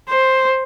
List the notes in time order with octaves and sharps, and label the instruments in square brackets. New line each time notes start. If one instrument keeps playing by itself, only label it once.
[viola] C5